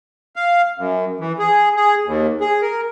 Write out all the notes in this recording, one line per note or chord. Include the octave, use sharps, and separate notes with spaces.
F5
F#2
E3
G#4
G#4
D#2
G#4
A#4